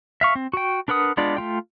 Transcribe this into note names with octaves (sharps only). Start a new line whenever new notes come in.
E5 F5 C#6
C4
F#4 G5
D4 A#4 B4 F#5 D#6
G#3 B3 D4 F4 D5
A3 F4 G5